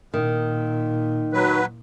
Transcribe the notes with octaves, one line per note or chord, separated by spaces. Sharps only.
A#2 D#3
F#3 B4